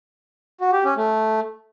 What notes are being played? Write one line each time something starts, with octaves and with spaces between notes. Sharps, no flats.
F#4
G4
C#4
A3